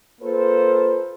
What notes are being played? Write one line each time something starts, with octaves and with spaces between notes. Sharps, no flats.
A#3 F4 A4 B4 C5